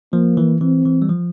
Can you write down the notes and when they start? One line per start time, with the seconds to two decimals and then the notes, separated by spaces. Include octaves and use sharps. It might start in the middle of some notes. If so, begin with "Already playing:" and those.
0.13 F3 A#3
0.37 E3
0.61 E3 C4
0.85 E3
1.02 G3
1.09 F3